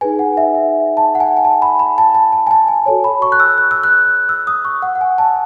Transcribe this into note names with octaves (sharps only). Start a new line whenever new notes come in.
D#4 G#4 B4 G#5
F#5
E5
E5
A5
F#5
G#5
G#5
A5
B5
B5
A5
A5
A5
G#5
A5
G#5
F#4 A4 C#5 A5
B5
C#6
F#6
E6
F#6
E6
F#6
E6
D#6
C#6
F#5
F#5
G#5
A5